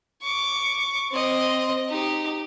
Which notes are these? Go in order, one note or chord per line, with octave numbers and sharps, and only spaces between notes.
C#6 D6
C4 D#5
D#4 G4